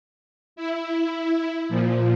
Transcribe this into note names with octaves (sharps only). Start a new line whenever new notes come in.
E4
A#2 F3